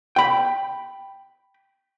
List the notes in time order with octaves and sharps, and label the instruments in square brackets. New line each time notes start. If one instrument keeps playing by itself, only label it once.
[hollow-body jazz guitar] G5 B5